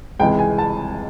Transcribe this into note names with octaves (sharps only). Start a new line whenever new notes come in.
C#2 C3 E3 G#3 G5
G#5
A5